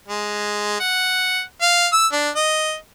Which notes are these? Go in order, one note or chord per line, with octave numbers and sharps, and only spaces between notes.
G#3
F#5
F5
E6
D4
D#5